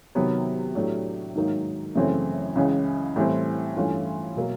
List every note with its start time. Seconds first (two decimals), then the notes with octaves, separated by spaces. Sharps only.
0.15 C3 D#3 F#3 B3
0.75 A2 F#3 A3 D4 G4
1.35 G#2 D#3 F#3 A#3 D#4
1.95 F#2 C#3 E3 A3 C4
2.55 C#2 C#3 E3
3.16 A2 E3 G3 C4
3.77 G2 E3 A3 C#4 F4
4.36 B2 F#3 A#3